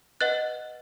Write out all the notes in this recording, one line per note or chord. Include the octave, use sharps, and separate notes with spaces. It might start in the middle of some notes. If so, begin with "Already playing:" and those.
B4 D#5 F#5 F#6 A6